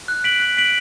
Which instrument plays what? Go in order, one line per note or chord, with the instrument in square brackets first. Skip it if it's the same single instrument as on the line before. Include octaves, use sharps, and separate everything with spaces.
[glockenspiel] F#6
B6 D7 F#7
F#6
B6 D7 F#7